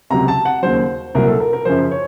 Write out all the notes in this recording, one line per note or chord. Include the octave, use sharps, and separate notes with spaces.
C#2 C3 F#3 A#5
A5
F#5
D#2 C#3 F#3 C5
C2 A#2 F#3 A#4
A4
A#4
A#4
F#2 C#3 F3 C5
C#5